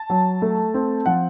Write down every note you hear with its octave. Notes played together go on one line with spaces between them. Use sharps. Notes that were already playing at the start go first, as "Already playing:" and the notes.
Already playing: A5
F#3
A3
C4
F3 F#5